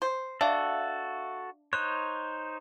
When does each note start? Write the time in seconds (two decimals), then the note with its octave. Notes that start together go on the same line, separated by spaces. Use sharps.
0.02 C5
0.41 D4 F#4 A4 E5 F5
1.73 D#4 C5 C#5 F#6